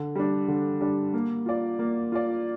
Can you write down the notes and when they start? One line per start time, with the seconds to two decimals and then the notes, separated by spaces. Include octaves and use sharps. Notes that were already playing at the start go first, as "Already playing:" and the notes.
Already playing: D3
0.16 G3 D4
0.48 D3
0.81 G3 D4
1.14 A#3
1.46 F4 D5
1.79 A#3
2.12 F4 D5